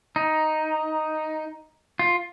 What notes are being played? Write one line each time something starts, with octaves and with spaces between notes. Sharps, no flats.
D#4
F4